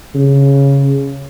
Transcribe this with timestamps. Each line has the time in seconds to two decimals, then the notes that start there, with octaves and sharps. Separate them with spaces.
0.15 C#3